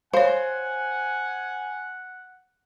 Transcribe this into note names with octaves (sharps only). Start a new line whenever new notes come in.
C5 C#5 F5 F#5 G#5